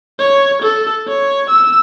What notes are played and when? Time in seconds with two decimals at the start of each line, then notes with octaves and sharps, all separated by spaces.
0.19 C#5
0.62 A4
1.08 C#5
1.50 E6